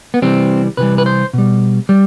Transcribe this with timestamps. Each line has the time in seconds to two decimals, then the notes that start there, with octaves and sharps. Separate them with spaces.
0.14 B3
0.22 C3 E3 G3 C4
0.77 C3 E3 G3 B4
0.98 B4
1.06 C5
1.33 B2 G3
1.89 G3